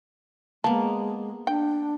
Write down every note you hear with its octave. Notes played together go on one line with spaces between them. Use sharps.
G#3 A#3 B3 A5
D4 G5